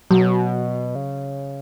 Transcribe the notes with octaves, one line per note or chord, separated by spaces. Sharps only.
B2 F#3
C#3